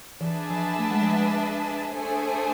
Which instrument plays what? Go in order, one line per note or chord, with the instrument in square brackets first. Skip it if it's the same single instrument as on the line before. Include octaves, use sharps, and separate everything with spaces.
[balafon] E3 [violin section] D4 G#4 B4 E5 A5
[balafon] F3
A3
G#3
F3
G#3
[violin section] A3 D4 G#4 C5 G#5